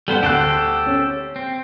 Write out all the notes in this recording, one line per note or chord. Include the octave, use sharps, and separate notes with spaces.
G3 B3 A4 C5 F#5
D2 G4 A4 C5 F#6
C#4
C4